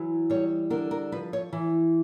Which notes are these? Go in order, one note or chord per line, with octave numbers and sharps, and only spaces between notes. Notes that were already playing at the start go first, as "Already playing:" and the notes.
Already playing: E3 F#3
G3 C#5
D3 A#4
A#4
F3 B4
C#5
E3